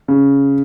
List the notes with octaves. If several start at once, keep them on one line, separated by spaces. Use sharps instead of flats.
C#3